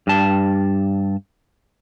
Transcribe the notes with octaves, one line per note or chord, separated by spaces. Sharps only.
G2 A5